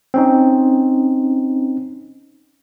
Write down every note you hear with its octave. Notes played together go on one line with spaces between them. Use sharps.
C4 C#4 D#4